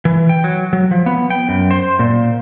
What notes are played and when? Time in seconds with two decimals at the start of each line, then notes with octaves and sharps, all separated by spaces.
0.05 E3
0.29 G5
0.44 F#3
0.73 F#3
0.91 F3
1.06 B3
1.30 G5
1.49 F#2
1.71 C5
1.99 A#2